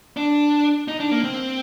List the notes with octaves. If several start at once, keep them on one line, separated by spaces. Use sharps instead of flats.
D4
D#4
D4
A#3
C4